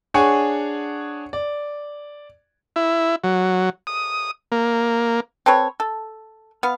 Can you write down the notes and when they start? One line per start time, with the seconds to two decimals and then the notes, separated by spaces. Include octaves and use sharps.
0.14 D4 G#4 C#5 F#5 G#5 C#6
1.33 D5
2.76 E4
3.24 F#3
3.87 D#6
4.52 A#3
5.46 C4 A4 B4 C#5
5.80 A4
6.63 B3 F5